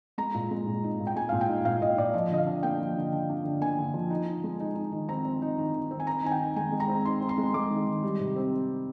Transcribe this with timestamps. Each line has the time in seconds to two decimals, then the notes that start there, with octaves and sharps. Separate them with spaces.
0.18 G#3 A#5
0.34 A#2
0.51 G#3
0.67 A#2
0.84 D#4
1.00 A#2
1.07 G5
1.16 G#3 G#5
1.29 A#2 F5
1.41 G5
1.49 D#4
1.65 A#2 F5
1.81 A#2 D#5
1.98 A#2 D5
2.14 F3 D#5
2.30 D3 D#5
2.38 F5
2.46 D4
2.63 A#3 G5
2.80 F3
2.96 D3
3.12 D3
3.29 D4
3.45 D3
3.61 A#3 G#5
3.78 D3
3.94 F3
4.10 D#4
4.27 D#4
4.44 G#3
4.60 D#4
4.75 D#4
4.92 D#3
5.09 C4 A#5
5.25 C4
5.42 D#4
5.58 D#3
5.74 D#3
5.91 C4
6.00 G#5
6.07 C4 A#5
6.23 D#3 G#5
6.32 G5
6.40 D#3
6.56 G#3 G#5
6.72 G#3
6.80 A#5
6.88 C4
7.05 D#4 C6
7.21 C4
7.29 C6
7.38 G#3
7.54 G#3 D6
7.70 D#3
7.86 D#3
8.03 G3
8.20 C3
8.36 C4